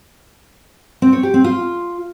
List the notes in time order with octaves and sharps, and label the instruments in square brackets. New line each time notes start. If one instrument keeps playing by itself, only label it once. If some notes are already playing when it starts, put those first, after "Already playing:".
[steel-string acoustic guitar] C4
C#5
G4
C4
F4